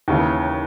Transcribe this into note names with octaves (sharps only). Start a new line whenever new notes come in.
D#2 C#3 E3